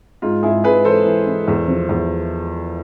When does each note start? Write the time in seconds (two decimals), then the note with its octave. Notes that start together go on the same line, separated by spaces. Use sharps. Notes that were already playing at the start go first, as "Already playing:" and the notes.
0.22 G#2 F4
0.43 G#2 E4 G#4
0.64 G#2 G#4 B4
0.85 E3 A4 C5
1.06 E3
1.27 E3
1.48 E2
1.68 F3
1.89 E2